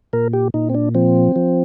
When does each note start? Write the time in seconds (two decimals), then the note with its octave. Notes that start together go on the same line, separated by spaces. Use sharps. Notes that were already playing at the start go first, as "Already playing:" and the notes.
0.13 A#2 A#4
0.33 G4
0.54 A#2 D#4
0.69 C4
0.74 D4
0.95 F3 C4
1.36 F3